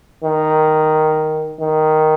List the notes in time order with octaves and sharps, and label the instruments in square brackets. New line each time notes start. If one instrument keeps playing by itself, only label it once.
[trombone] D#3
D#3